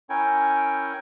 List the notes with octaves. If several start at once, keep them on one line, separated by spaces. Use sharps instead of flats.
C#4 E4 A#4 G5 G#5